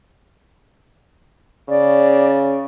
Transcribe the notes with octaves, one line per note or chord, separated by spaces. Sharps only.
C#3 D5